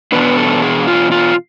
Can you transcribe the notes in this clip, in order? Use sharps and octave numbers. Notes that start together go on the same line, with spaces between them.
E2 B2 B3 D4 B4
A4
G#4
F4
F4